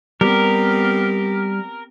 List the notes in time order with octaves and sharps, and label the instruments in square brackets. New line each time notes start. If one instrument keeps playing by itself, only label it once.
[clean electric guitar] G3 [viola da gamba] B3 C4 G4 [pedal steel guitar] A#4